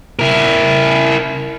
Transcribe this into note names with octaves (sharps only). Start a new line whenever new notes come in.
E4 A#4